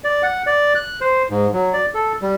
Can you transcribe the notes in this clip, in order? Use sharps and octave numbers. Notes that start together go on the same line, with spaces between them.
D5
F#5
D5
F#6
C5
G#2
F#3
D5
A4
G3